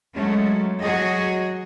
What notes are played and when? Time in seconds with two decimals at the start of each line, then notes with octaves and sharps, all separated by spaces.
0.15 F#3 G#3 A3 C#4
0.82 F#3 F#4 G#4 D#5